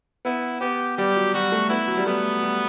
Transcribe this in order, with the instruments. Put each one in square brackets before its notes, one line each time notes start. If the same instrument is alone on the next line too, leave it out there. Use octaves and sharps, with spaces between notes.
[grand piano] B3 [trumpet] E4
[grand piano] B3 [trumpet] G4
[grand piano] G3 [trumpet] G4
[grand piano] F#3
[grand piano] G3 [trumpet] F#4
[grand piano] A3
[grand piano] B3 [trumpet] E4
[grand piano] F#3
G3
[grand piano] A3 [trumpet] B3
[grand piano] G3